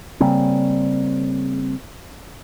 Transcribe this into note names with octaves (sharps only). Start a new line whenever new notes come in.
C#3 G3 A#3 C4